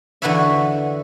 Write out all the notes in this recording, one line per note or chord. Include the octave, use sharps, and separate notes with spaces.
E2 D3 F#4 B4 C#5 E5